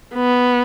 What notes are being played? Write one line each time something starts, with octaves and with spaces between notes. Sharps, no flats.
B3